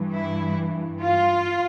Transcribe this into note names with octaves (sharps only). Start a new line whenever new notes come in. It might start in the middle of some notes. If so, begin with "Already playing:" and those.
Already playing: G2 E3
E4
F4